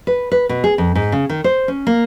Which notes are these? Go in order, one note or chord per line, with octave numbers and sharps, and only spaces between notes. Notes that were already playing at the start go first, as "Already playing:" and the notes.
B4
B4
B2
G#4
F2
G#2
C#3
D#3
C5
C#4
A#3